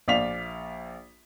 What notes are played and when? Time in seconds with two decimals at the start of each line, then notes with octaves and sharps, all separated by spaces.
0.08 A#1 D5 F5 B6 F7